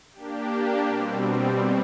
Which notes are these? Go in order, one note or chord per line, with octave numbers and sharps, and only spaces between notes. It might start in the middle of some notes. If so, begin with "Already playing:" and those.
A#3 D4 G4
B2 G3 C4